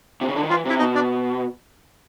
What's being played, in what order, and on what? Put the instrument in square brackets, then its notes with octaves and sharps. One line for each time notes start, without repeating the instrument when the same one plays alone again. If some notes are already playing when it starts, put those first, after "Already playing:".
[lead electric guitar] C3
C#3
D3
D#3
[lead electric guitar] E3 [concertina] F4 F5
[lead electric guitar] C3 [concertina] E4 E5
[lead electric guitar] B2 [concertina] D#4 D#5
[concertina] D4 D5